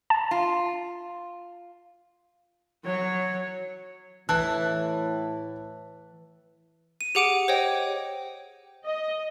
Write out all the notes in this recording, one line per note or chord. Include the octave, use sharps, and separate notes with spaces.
A5
F4
F#3 C#5
A2 E3 E4 A5 F#6
D#7
G4 G#4 F#5 D6 D7 D#7
C5 C#5 D#5 G5
D#5